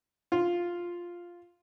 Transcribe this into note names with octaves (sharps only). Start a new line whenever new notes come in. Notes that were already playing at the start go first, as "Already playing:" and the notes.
F4